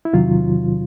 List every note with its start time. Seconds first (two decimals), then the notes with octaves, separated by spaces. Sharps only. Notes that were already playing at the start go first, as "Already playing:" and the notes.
0.05 E4
0.13 E2 C3 D#3 F#3 F4